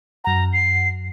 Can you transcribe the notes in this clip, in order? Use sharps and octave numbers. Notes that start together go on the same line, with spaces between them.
F#2 F#5 A#5
C7